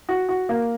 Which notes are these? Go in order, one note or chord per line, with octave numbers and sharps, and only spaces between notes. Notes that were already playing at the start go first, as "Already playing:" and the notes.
F#4
F#4
A#3